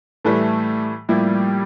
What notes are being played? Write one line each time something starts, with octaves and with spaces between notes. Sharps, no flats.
A2 E3 G3 A3
A2 F3 G3 A#3 E4